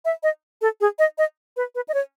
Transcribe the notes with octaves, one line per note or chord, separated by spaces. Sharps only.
E5
D#5
A4
G#4
D#5
D#5
B4
B4
D#5
C#5